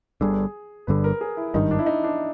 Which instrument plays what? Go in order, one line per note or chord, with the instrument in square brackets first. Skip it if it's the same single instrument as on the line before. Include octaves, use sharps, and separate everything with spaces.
[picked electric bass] G1 G2 D3 [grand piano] G#4
[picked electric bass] G1 G2 D3 [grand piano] B4
[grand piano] A#4
G#4
E4
[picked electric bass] G#1 G2 D#3 [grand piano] D#4
[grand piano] D4
E4
D#4
D4